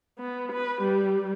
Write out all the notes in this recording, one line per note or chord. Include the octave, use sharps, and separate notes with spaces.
B3
B4
G3